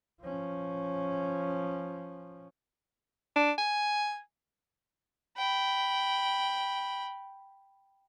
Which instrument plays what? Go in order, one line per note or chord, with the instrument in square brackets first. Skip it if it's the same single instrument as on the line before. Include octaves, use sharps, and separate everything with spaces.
[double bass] F3 C#4
[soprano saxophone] D4
G#5
[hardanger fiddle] G5 B5